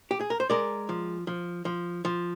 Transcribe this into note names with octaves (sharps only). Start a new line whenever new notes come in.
G4
G#4
A#4
C5
G#3 A#4 D5
F3
F3
F3
F3